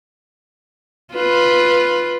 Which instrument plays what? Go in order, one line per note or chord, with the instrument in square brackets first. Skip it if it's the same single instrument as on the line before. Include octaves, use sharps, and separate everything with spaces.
[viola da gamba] F4 B4